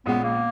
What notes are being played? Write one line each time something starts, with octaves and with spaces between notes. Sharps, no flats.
A#1 A#2 G#3 B3 C#4
A#3